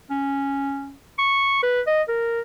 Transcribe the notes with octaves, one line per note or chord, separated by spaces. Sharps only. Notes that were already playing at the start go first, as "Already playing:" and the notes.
C#4
C#6
B4
D#5
A#4